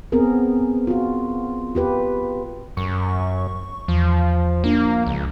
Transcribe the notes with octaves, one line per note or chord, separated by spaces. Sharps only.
B3 C4 G#4 A#4
F4 F#4
F4 G4 B4
F#2 C#6
E2 F3
F3 A#3 D4
C#2